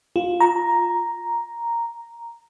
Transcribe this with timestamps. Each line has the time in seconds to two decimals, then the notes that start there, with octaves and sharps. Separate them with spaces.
0.16 F4
0.40 A#5